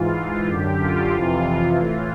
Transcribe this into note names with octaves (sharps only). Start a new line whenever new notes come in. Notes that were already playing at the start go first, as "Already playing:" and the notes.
Already playing: G#2 E3 F4
F#2 D3 G4
F4
F2 C3 E3
A2 E3